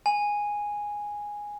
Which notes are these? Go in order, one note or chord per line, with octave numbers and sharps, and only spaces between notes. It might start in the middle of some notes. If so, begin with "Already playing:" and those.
G#5